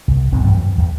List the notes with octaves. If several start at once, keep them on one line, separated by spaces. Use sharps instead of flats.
C2
D1 B1 G#2 C4
F#2 E3 F3 G3
E2